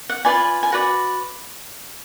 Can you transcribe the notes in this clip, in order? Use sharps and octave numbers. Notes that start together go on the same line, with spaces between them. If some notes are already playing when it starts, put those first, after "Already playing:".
F#5
F4 B4 D5 G#5
G#5
F#4 B4 D5 F#5